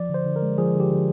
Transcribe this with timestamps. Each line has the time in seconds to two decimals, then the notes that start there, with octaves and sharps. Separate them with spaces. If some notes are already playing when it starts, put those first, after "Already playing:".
Already playing: F3 D5
0.10 D3 C5
0.26 D3
0.36 A#4
0.42 G#3
0.58 F3 G#4
0.75 D3
0.80 G4
0.91 D3